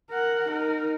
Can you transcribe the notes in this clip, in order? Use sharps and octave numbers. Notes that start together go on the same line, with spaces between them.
A#4 F#5
D#4 A#4